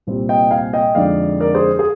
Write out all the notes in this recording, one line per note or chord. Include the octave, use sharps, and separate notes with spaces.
C2 A#2 G3 C4
D#5 G5
F5 G#5
D#5 G5
F2 D3 G#3 D#4 D5 F5
A#4 D5
G#4 C5
G#4